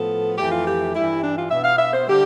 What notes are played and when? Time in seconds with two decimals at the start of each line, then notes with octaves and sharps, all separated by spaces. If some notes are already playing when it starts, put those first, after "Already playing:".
Already playing: A2 F3 B3 A4
0.37 F2 E3 A3 G4
0.51 F4
0.66 G4
0.94 G2 E3 G3 E4
1.22 D4
1.37 F4
1.50 B2 B3 E5
1.64 F5
1.78 E5
1.93 C5
2.07 D3 G3 G4